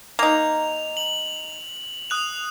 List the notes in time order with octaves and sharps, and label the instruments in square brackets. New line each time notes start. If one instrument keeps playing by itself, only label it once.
[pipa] A#3 D#4 [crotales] F7
[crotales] F#7
D#6 F#6 F7